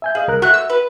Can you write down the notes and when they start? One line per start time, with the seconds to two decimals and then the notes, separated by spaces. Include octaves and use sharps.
0.02 E5 G#5 G6
0.15 G#4 D#5 F5
0.28 C2 A#4 F#6
0.42 A3 F#4 E5 F#6
0.54 E6
0.70 B4